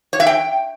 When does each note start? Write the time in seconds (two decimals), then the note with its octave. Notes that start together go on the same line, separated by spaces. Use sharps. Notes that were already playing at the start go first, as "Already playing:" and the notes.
0.13 C#5
0.20 E5
0.27 G5